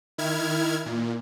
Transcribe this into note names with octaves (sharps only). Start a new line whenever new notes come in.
D#3 E4 F6 G#6
A#2